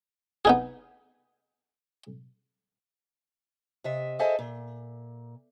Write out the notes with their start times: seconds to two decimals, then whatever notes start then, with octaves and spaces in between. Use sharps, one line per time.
0.45 B3 D#4 G#4
3.84 C3 D#5 E5
4.19 G#4 A4 C5 D#5 E5 G#5
4.39 A#2